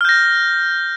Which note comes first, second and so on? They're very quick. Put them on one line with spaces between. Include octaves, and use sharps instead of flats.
F6 G6 A#6